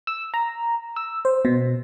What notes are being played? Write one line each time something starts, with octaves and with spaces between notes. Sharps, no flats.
E6
A#5
E6
C5
B2